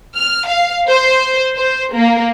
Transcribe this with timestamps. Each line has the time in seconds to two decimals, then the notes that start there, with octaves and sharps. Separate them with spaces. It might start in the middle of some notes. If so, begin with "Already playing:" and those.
0.15 F6
0.47 F5
0.88 C5
1.55 C5
1.94 A#3